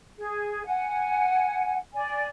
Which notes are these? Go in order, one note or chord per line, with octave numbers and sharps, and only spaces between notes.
G#4
F#5 G#5
D5 G#5